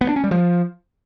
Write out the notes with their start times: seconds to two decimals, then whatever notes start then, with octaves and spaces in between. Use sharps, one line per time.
0.01 B3
0.09 D4
0.16 C#4
0.24 G3
0.31 F3